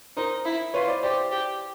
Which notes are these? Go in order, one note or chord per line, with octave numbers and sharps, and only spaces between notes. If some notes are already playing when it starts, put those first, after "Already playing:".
D#4 A#4 C5
E4
F4 B4 C#5
C5 D5
G4 C5 D5
G4